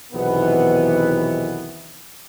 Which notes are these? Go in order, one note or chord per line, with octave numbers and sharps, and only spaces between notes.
B1 E2 C3 D#3 E3 B3